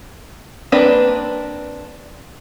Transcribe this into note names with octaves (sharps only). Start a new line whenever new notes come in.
A#3 C4 D4 B4